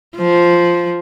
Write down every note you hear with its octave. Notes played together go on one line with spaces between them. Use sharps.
F3